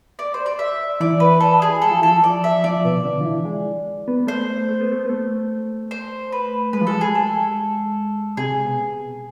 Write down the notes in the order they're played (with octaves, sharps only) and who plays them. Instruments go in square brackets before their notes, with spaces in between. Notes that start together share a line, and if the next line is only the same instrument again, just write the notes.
[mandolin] D5
C5
D5
E5
[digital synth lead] E3 [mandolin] D5
[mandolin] B4
A4
G#4
[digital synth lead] G#3 [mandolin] A4
[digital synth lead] F3
[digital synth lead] E3 [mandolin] A4
[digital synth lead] F3
[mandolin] D5
E5
[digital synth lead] F3 [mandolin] D5
[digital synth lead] B2
D3
F3
E3
G#3
B3
[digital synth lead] A3 [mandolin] C5
[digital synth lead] A3
B3
A3
B3
A3
[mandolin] C5
B4
[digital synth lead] G#3 [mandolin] B4
[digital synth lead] F3
[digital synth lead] G#3 [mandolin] A4
[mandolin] G#4
A4
[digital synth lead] C3 [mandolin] G#4
[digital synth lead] B2